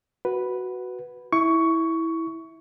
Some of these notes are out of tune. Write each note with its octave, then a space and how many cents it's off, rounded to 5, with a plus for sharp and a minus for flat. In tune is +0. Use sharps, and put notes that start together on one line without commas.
F#4 +0 B4 +0
E4 -10 C#6 +15